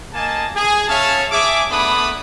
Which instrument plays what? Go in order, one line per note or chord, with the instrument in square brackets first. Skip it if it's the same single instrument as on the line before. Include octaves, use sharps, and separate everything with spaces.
[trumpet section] A#3 D#5 G#5 A5
G#4
C#4 C#5 E5 F5 A5
G#4 E5 D6
A3 B3 D4 B4 B5 D#6